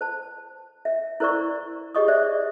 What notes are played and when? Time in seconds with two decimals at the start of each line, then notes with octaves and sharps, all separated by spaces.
0.01 C5 A5
0.85 E5
1.20 E4 A#4 C5 D5 C#6
1.95 G4 G#4 C#5 D#5 C#6 D#6
2.08 C5 D5 E5